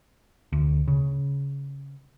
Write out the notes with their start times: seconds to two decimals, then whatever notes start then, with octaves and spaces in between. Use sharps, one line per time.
0.52 D2
0.88 C#3